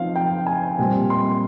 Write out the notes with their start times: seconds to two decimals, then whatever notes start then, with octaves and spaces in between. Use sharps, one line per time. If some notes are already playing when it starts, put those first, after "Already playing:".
Already playing: F3 C4 D#4 F5
0.16 G5
0.47 G#5
0.78 A#2 G3 C4
1.10 C6